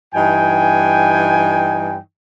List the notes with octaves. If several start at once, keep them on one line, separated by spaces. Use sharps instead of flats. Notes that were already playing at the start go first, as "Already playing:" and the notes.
G2 E3 D#4 G5 G#5